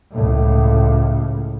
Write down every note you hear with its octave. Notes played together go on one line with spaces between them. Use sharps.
C#2 A2